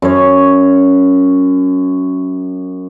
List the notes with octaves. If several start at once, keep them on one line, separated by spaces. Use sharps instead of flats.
F#2 C#5